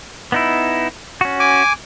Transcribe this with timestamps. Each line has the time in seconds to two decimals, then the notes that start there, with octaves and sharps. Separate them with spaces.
0.32 B3 D#4 E4
1.21 C#4 F#4
1.40 G#5 D6